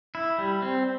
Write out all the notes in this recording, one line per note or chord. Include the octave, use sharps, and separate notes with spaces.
E4
G3
C4